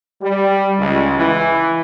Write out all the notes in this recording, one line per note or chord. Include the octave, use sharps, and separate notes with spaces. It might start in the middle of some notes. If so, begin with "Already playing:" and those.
G3
C#2
E3